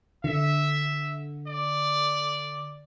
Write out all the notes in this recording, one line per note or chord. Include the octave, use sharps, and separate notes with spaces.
D3 E5
D5